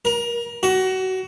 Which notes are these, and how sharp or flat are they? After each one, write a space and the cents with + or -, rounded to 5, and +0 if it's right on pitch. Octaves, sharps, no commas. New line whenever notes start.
A#4 +25
F#4 +25